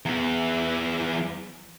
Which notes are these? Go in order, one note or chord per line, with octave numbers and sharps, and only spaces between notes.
E2 E3